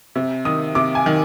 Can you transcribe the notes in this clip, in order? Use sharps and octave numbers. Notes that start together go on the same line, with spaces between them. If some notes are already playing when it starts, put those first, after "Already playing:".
C3
D#3 D#6
C3 D6
G#5
D#3